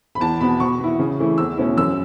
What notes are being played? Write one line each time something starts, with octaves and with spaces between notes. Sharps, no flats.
B5
E2 A5
B2 B3 B5
B2 C#6
B3 E4
C#3
E3 A3 E4
E2 E6
B2 A3 C#4 E4
F#2 E6